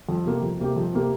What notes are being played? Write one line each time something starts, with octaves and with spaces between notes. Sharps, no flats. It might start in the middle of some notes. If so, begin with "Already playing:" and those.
F2
C3 A#3 G4
F2
C3 A#3 G4
F2
C3 A#3 G4